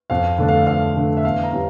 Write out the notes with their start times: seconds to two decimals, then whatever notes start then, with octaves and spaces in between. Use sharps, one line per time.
0.10 F2 F5
0.38 D3 A3 D4
0.48 F5
0.67 F2 F5
0.96 D3 A3 D4
1.17 E5
1.24 E2 F5
1.44 A#5
1.52 E3 G3 C#4